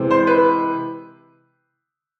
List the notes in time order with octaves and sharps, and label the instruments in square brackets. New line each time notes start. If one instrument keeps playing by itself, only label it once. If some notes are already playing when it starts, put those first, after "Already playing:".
Already playing: [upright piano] C3 E3 G#3 C4
C5
B4